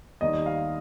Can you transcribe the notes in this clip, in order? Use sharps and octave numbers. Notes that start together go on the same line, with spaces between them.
D#2 D#3 G3 D#5
F5